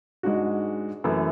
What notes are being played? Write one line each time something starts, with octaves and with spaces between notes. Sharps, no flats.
G#2 G#3 D4 F#4
F#2 E3 A3 E4